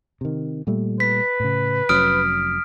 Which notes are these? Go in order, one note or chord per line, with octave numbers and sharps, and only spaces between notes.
C3 D#3
A#2 G3 A3
B4 B6
A2 C#3
F1 F#3 C#4 D#6 F6 D7